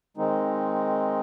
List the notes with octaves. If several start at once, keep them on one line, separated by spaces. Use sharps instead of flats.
D#3 G#3 C4 D#4